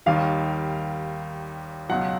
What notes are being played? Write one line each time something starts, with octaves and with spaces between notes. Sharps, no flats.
D#2 D#3 G3 F5
C#2 B2 F#3 F#5